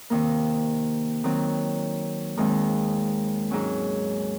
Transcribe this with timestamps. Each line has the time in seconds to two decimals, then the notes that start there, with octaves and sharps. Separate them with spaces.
0.10 C3 D#3 A#3
1.24 D#3 F#3 C4
2.37 D#2 D#3 G#3 C4
3.51 G#2 F#3 C#4